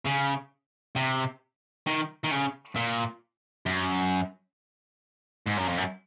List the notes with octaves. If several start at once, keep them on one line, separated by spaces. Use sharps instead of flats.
C#3
C3
D#3
D#3
C#3
A#2
F#2
G#2
F#2
F2
F#2